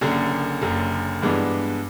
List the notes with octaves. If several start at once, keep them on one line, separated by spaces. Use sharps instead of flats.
F#1 F#2 D3
F#1 F#2 D3
G2 E3 G#3 B3 D4